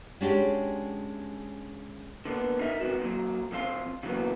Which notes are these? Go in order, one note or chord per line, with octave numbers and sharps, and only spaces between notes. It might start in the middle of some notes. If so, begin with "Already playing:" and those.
G#3 C#4 D4 F#4 G4
D3 A#3 B3
D#4 A#4 D#5 E5
C3 D#3 G#3 B3 D4 F#4
A#2 D#3 F#3
B1 C3 F3 C4 F5 C6
C#3 E3 F#3 G3 A#3 B3